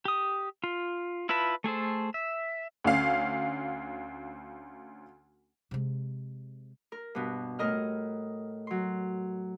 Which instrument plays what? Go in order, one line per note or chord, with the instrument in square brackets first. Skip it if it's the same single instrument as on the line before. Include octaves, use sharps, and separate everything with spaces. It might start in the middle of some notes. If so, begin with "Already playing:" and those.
[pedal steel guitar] G4 D#6
F4
E4 F4 B4 A5 B5
A3 G#4 A4 C5
E5
[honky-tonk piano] D2 C#4 F5
[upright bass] C3 G#3
[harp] A#4
G2 B2
A2 A#4 D#5 F6
F#3 C6